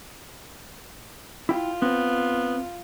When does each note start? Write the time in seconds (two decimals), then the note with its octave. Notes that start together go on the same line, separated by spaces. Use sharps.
1.49 E4 F4 G5
1.82 B3 C4 C5